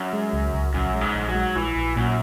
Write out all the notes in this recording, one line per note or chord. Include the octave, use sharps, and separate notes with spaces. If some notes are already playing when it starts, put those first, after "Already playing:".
Already playing: F#2
G#3
C#2
C#2
A#1 F#2
G#3
G#2
A#1
F#3
G#3
A#1 E3
A#1
F#2 A#2